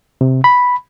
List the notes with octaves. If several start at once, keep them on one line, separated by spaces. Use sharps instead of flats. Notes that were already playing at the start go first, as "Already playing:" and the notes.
C3
B5